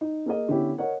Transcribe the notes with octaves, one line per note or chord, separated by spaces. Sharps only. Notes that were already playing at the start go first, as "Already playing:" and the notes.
D#4
A#3 G#4 A#4 D#5
D3 B3 C#4 E4 G4
A#4 C#5 D#5 F#5